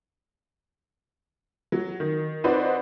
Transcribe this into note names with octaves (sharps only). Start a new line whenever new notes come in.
F#3
D#3
C4 D#4 F#4 B4 C5 D5